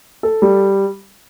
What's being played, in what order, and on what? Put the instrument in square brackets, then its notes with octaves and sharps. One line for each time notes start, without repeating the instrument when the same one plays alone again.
[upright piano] A4
G3